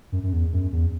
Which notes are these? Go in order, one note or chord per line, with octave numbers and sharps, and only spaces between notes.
F#2
F#2
E2
F#2
E2